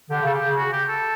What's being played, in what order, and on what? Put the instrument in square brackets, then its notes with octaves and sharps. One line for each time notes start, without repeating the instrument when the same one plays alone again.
[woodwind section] D3 [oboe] G4
[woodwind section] C#3 [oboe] A4
[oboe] G4
[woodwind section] C#3
[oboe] F#4
G4
A4